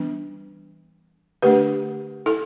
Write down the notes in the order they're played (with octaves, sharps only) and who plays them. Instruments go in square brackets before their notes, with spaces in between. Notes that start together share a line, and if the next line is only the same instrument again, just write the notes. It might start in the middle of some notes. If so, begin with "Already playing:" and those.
Already playing: [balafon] E3 G3 B3 D4
D3 A3 D4 G4 B4
E4 A4